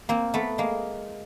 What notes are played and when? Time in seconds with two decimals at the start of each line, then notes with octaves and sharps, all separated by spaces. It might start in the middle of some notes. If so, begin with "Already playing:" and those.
0.09 A#3 C4
0.34 A3 B3
0.58 G#3 A#3